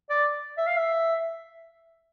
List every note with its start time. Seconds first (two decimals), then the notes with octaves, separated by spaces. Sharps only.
0.10 D5
0.57 E5
0.67 F5
0.77 E5